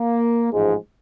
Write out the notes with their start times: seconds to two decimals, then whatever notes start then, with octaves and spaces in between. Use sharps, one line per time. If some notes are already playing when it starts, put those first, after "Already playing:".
Already playing: A#3
0.53 A1 G#2 F3 G#3